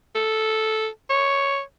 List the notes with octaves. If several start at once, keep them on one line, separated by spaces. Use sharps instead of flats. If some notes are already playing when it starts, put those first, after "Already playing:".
A4
C#5